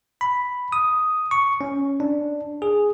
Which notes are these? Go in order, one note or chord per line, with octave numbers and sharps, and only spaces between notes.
B5
D#6
C#6
C#4
D4
G#4